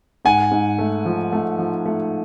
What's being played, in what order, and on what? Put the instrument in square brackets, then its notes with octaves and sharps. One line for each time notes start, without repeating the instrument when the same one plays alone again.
[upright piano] G#2 [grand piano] F#5 G#5
[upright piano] G#2
A3
F3
A3
F3
A3